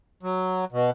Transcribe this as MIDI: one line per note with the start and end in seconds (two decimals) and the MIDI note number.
0.23 0.65 54
0.72 0.90 47